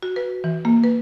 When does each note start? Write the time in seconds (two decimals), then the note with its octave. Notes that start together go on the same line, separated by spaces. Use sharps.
0.03 F#4
0.16 B4
0.44 E3
0.65 A#3
0.84 B4